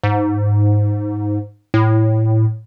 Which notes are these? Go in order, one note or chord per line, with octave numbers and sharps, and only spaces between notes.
G#2
A2